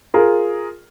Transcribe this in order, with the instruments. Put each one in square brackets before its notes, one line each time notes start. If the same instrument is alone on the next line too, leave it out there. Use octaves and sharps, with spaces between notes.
[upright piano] F4 G#4 A#4